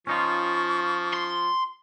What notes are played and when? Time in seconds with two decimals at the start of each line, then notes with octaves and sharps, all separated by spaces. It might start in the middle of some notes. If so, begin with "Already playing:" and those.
0.07 F3 C#4 D#4 F4 C#6
1.14 C6